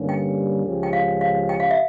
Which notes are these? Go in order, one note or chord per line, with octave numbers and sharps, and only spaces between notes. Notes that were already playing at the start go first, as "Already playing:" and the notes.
Already playing: G2 D3 G3 A#3 C#4
G5
C#2 C#3 F3 C#4 G4
G5
F5
F5
G5
F5
E5